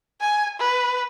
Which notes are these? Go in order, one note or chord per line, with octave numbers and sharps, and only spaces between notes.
G#5
B4